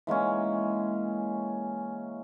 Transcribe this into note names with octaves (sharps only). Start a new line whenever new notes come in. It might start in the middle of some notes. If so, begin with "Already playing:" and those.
E3 G#3 A#3 C#4